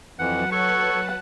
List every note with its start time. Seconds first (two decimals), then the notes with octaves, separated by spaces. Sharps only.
0.19 F2 E3 F#3 B4 F#5 A5
0.52 A4 C#5 F#5 C#6